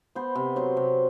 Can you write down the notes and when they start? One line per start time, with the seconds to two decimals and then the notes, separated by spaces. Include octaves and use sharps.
0.15 B3 C5
0.35 C3
0.56 F#3 C5
0.77 C3